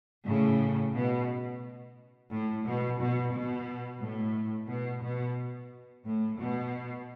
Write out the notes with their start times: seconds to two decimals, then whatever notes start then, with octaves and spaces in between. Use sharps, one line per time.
0.25 A2 C#3
0.94 B2
2.30 A2
2.65 B2
2.98 B2
3.33 B2
4.00 A2
4.68 B2
5.02 B2
6.04 A2
6.38 B2